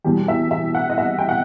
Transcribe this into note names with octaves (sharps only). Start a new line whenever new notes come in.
E2 B2 G3 G4
E5
E5
F#5
D#5
E5
G5
F#5